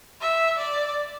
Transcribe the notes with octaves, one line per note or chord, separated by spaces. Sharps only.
E5
D5